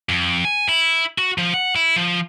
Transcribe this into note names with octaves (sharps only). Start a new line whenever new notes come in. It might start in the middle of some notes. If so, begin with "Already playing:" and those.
F2
G#5
E4
F#4
F3
F#5
E4
F3